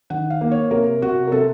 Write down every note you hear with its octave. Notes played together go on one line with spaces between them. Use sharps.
D#3 F#5
F5
A#3
C#5
C3 A#4
C3 F#4
A#4
C3 A4